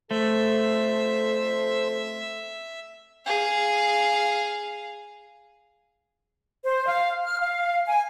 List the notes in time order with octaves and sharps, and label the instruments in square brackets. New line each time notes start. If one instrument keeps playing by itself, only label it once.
[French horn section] F2 A4 [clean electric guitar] A3 [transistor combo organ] C5 [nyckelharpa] E5
[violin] G#4 F5
[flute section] C5
F5
F6
F5
G#5